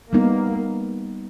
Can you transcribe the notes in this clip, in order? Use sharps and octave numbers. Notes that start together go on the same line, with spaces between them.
G3 A#3 B3 D#4